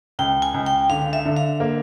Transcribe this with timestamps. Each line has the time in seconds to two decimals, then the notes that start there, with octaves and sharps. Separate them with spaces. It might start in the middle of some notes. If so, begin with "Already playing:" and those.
0.19 C#2 G5
0.42 G#5
0.54 C#2
0.66 G5
0.89 D3 F5
1.13 E5
1.25 D3
1.37 F5
1.60 A#3